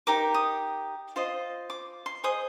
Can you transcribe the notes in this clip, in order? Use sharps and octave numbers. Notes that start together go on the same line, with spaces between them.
D#4 G4 A#4 D6
D#6
F4 C5 D#5
D6
C6
G#4 C5 D#5 D#6